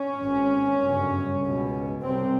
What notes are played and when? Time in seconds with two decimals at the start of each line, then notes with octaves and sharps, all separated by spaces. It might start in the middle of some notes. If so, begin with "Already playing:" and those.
Already playing: C#4
0.19 G#1 G#2
0.80 G1 F#2 C#3
1.42 C#2 B2
2.02 C2 C3 C4